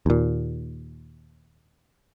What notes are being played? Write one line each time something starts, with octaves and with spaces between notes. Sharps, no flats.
D#2 A#2